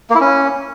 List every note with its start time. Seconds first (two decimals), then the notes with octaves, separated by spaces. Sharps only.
0.10 A#3
0.15 E4
0.20 C#4